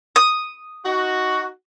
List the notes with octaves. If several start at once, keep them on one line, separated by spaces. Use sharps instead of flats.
D#6
D#4 F#4